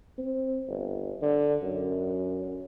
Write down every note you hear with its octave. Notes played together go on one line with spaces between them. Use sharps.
C4
G1
D3
F#2